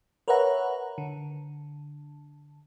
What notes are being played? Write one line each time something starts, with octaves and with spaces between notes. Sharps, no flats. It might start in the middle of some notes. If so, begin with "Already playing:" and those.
A#4 B4 C#5 E5 F#5 A#5
D3